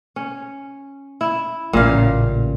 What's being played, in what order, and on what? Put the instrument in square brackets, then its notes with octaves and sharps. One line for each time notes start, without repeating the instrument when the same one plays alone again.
[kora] C#4
E4
[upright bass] A1 C#3 [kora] A#2 F5